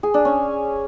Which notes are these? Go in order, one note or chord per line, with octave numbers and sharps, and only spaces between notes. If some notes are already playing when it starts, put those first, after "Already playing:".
G#4
D4
C#4